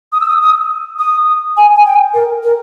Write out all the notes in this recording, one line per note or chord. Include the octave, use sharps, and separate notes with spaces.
D#6
E6
D#6
D#6
D#6
G#5
G#5
G5
A#4
A#4